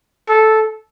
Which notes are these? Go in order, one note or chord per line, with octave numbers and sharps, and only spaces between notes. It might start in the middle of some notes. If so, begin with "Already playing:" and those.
A4